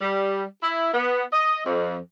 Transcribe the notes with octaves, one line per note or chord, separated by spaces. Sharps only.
G3
E4
B3
D#5
F2